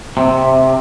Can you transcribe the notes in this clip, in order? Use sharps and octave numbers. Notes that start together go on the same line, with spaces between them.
C3